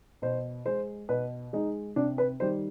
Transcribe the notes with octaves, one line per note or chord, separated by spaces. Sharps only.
B2 C5
G#3 C5
B2 B4
G#3 D#4
C3 D4
B4
D#3 G3 C5